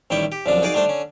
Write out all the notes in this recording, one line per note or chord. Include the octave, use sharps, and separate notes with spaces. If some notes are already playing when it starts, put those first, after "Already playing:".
A1 D#3 G3 E4 G5 C#6
G4
C2 F#2 D3 F3 D4
D#4 F#4 G#4 A#4 D5 F5
G3 A3 D4 C5
D3 C#4